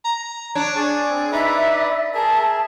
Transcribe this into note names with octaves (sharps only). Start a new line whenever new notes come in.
A#5
D4 C#5
G#4 C#5 D5 A5
C4
D#4 B4 D5 E5 B5
G#4 A#4 E5 A5